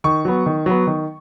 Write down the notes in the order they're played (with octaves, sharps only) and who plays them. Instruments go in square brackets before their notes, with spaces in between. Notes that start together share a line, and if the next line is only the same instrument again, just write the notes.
[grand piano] D#3 C#6
F#3 B3
D#3
F#3 B3
D#3